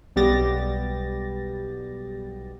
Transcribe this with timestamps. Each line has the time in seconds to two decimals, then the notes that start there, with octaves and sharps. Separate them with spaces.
0.16 B1 G3 B3 G4 A6 A#6